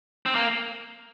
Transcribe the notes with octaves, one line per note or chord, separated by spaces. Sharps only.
C4
A#3